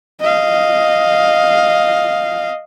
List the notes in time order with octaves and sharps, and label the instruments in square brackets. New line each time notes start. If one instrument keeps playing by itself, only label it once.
[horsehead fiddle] D#5 F5